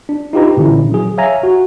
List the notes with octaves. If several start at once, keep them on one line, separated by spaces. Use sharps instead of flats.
D4
D#4 F4 G4 B4 A#5
A#2 D3 E3 C#4 E4
F#3 G#4
C#5 E5 F5 G#5 A#5
F#4